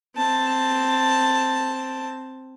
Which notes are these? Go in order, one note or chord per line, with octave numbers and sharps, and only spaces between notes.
C4 A5